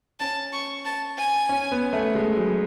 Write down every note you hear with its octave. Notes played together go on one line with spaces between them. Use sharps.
C#4 A5
C#6
A5
G#5
C#4
B3
A3
G#3
F#3